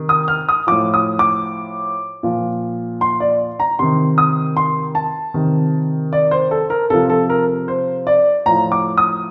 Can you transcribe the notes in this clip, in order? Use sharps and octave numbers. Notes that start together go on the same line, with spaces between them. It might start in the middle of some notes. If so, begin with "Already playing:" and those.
Already playing: C3 D#3
D#6
F6
D#6
A2 F3 D6
D#6
D6
A#2 F3
C6
D5
A#5
C3 D#3 C6
D#6
C6
A5
C3 D#3
D5
C5
A4
A#4
C3 F3 A4
A4
A#4
C5
D5
A2 F3 A#5
D6
D#6